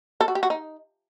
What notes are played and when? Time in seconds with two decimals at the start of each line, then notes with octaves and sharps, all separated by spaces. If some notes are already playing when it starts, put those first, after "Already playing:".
0.21 A4
0.28 F#4
0.35 G4
0.43 F#4
0.50 D#4